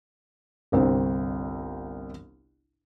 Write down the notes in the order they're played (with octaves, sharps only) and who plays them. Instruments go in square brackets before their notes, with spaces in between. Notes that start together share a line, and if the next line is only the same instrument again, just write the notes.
[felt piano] G1 C2 C4